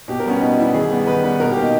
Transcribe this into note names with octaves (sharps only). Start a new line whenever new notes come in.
B2 G4
A#4
G3 B3 C#4
B2 D#4
G3 B3 E4
D#3 G#4
G3 B3
D#3 B4
G3 B3 B4
B2 A#4
G4
A#3
D#4